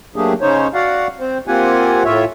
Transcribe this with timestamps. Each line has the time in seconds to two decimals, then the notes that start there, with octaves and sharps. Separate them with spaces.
0.16 F#3 A3 A#3 D4 G4 G#4
0.41 C#3 C#4 D#4 C5 C#5
0.74 F#4 D5 F5 F#5
1.20 C4 C5
1.47 A#3 C4 F4 G4 F#5 G#5
2.05 A2 F4 C#5 E5